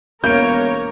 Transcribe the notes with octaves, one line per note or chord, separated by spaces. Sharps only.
E1 A#3 A#4 C#5 G6 D7